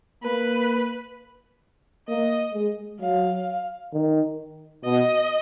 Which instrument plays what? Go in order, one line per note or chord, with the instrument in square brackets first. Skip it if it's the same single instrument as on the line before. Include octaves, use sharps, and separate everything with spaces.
[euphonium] A#3 [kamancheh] B4
[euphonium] A#3 [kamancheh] D#5
[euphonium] G#3
[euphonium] F#3 [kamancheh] F5
[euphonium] D#3
[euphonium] B2 [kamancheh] D#5